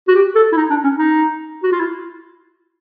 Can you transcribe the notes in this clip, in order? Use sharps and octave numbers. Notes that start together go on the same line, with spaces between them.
F#4
G4
A4
E4
D#4
D4
C#4
D#4
F#4
F4
E4